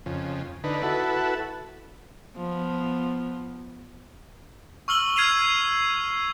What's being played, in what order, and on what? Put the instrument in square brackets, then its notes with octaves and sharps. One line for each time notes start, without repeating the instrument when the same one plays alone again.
[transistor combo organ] F2 C#3
D3 D#4 B4
E4 F#4 A4 B4
[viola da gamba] F3 B3
[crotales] C#6 E6 F6 F#7 G7
F6 G#6 C7 D#7 F7